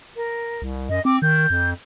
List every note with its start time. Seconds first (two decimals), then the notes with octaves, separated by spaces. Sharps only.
0.16 A#4
0.62 C2
0.89 F#2 D#5
1.05 C4 D6
1.22 D#3 G6
1.50 F2